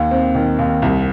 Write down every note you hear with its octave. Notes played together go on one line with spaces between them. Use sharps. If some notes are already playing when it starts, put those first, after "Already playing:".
Already playing: D#2
C4
D#3
D#2
C2